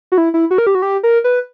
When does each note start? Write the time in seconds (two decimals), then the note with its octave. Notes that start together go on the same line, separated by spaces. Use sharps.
0.12 F#4
0.18 E4
0.34 E4
0.51 F#4
0.58 A#4
0.67 G4
0.75 F#4
0.82 G4
1.03 A#4
1.24 B4